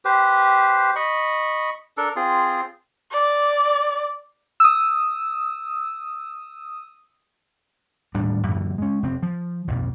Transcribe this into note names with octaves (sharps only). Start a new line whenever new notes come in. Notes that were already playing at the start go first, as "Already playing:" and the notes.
G4 B4 C5
D#5 B5 C#6
D4 A4 A#4
C4 F4 G#4
D5
D#6 E6
D#1 A2 G3 D4
F#2 A#2 D3
G#3 C#4
F1 C4
F3
B1 F2 A#2